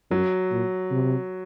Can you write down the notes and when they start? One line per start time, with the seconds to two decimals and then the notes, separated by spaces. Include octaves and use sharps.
0.11 F#2 F#3
0.51 A#2
0.91 C3